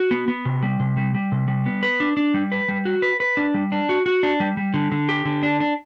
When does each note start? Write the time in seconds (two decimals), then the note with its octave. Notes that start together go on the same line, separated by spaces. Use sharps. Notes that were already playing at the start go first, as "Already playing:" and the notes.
Already playing: F#4
0.11 B3
0.28 B3
0.45 C3
0.63 G3
0.80 C3
0.97 G3
1.15 G3
1.32 C3
1.48 G3
1.66 B3
1.83 B4
2.00 D4
2.17 D4
2.34 G3
2.52 B4
2.68 G3
2.85 F#4
3.02 B4
3.20 B4
3.37 D4
3.54 G3
3.72 D4
3.89 F#4
4.06 F#4
4.23 D4
4.40 G3
4.57 G3
4.74 D3
4.92 D3
5.09 G4
5.25 D3
5.43 D4
5.60 D4